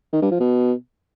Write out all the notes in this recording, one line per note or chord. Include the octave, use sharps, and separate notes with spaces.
D#3
G2
F3
B2